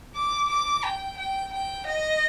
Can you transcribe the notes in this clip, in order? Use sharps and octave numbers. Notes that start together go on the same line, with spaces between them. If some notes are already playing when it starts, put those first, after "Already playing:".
D6
D6
G5
G5
G5
D#5